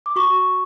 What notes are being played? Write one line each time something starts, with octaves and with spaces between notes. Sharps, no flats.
D6
F#4 C#6